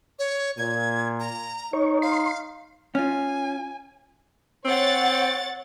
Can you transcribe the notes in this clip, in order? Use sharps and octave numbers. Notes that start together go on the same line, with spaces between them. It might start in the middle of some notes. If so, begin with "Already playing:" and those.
C#5
A#2 G#6
A#5
D#4 C#5
F5 C6
C#4 F4 G#5
C4 C#5 F#5 A6